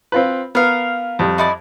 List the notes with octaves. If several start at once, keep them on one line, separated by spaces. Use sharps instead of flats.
C4 F4 B4
B3 A#4 F5
F2 G3
D#4 E4 D5